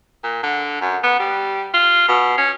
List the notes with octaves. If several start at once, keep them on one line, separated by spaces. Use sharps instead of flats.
A#2
D3
F#2
B3
G3
F4
B2
C#4